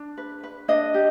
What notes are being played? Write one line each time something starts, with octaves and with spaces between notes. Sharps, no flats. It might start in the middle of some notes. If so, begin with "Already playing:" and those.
Already playing: D4
B4
B4
D4 D#5
G4